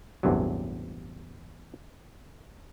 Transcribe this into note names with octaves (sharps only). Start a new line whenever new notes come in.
A1 E2 G2 C3 F#3